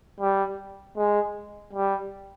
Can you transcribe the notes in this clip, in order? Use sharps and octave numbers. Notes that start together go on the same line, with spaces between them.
G3
G#3
G3